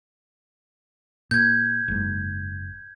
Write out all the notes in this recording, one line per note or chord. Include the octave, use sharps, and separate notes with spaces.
A#2 G6 G#6
F#1 G#2